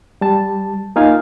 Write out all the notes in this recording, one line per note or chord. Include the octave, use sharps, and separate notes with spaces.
G3 A5
A#3 D#4 F4 F5 G#5